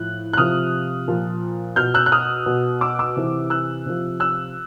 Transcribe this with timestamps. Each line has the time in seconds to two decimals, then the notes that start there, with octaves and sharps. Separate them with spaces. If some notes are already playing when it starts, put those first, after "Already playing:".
Already playing: A2 F3 F#6
0.33 F#6
0.37 C3 F3 D#6 F6
1.08 A#2 F3
1.76 B2 F6 G6
1.94 E6 F#6
2.06 F#6
2.12 D#6 F6
2.46 B2
2.81 D6 E6
2.99 D6 E6
3.17 C3 E3
3.50 E6 F#6
3.86 C3 F3
4.20 E6 F#6